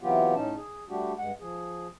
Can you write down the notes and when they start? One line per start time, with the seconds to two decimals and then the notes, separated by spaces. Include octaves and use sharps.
0.01 C3 E3 F#3 B3 F4 G4
0.35 A2 C#4 D#4 A5
0.56 G#4
0.89 G3 A3 D4 F#4 G4
1.18 G2 G#3 F#5
1.40 F3 G#4